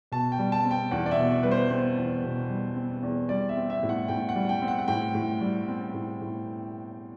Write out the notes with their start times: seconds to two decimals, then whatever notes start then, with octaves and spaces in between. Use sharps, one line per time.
0.12 B2 A5
0.32 G5
0.39 G3
0.52 A5
0.65 C4
0.71 G5
0.91 E2 F#5
1.06 D5
1.11 E5
1.18 B2
1.31 E5
1.43 G3 B4
1.51 C5
1.71 C4 C5
1.97 E2
2.23 B2
2.50 G3
2.76 C4
3.03 E2
3.29 G3 D5
3.49 E5
3.57 C4
3.70 E5
3.83 A2
3.89 F#5
4.08 A2 G5
4.29 F#5
4.35 G3
4.49 G5
4.62 C4
4.68 F#5
4.79 F#5
4.88 A2 G5
5.15 A2
5.41 G3
5.68 C4
5.94 A2
6.21 A2